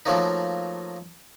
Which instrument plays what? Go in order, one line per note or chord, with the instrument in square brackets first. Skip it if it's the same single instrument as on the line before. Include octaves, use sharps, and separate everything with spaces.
[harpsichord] F3 F#3 A3 A#3 D#4